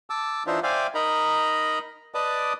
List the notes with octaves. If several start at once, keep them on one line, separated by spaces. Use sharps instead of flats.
A5 D6 E6
E3 D4 D#4 F4 C5 E5
C5 D5 E5 F5 G5 G#5
D#4 A#4 D#5 A#5 B5
B4 D5 D#5 A5 D6 D#6